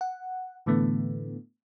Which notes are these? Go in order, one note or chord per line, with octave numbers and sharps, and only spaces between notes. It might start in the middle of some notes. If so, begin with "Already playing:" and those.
F#5
A2 D3 E3 A3 B3